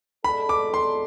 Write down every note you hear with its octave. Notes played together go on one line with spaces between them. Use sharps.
G#3 D4 A4 B5
D6
C6